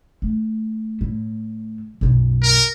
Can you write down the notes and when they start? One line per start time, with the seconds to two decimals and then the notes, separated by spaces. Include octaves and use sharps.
0.22 A3
1.01 A2
2.01 B1 F#2
2.42 A#4